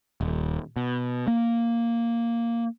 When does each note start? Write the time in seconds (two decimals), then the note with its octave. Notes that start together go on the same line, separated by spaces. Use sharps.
0.21 D#1
0.76 B2
1.28 A#3